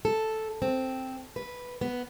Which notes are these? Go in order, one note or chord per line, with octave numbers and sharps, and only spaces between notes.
A4
C4
B4
B3